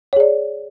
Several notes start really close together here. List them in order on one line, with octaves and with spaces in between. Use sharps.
C#5 G#4 D5